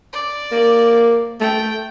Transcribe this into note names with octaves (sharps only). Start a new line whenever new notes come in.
D5
A#3
A3 G5